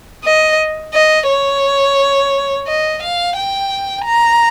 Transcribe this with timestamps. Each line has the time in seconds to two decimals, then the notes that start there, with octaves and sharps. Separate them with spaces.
0.25 D#5
0.94 D#5
1.29 C#5
2.67 D#5
3.02 F5
3.37 G5
4.05 A#5